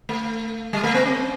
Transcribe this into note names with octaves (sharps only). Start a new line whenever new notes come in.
A3
G3
A3
B3
C4